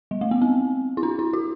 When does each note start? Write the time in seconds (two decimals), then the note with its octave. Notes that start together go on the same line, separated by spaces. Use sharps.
0.11 G3
0.21 A3
0.31 B3
0.42 C4
0.97 E4
1.03 D4
1.19 E4
1.33 F#4